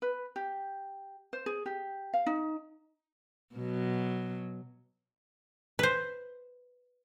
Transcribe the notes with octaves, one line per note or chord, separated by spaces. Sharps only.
B4
G4
C5
G#4
G4
F5
D#4
B2 F#3
B4 C5